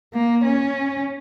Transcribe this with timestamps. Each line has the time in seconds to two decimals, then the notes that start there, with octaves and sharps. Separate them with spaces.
0.13 A#3
0.45 C#4